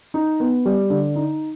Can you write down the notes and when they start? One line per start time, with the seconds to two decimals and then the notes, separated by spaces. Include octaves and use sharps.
0.14 D#4
0.40 B3
0.66 G3
0.90 D3
1.16 D#4